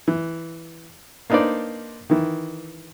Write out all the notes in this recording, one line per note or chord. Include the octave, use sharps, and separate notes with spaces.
E3
A#3 D4 D#4 B4 C5 D5
D#3 E3